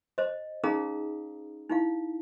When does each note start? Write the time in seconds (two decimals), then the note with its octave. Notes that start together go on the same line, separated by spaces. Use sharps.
0.18 C5 D#5
0.64 C#4 D#4 G#4 F5 A#5 D#6
1.70 D#4 E4 F5